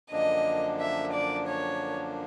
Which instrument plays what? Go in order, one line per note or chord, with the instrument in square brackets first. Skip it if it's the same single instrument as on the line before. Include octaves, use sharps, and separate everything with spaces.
[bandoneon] F#2 D3 F3 A#3 D4 [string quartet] D#5
[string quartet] E5
D5
C#5